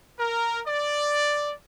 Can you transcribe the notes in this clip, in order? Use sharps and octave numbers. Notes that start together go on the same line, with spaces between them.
A#4
D5